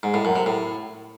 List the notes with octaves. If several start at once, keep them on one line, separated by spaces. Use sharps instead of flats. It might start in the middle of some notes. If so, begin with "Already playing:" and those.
G#2
A2
F#2
C3
A2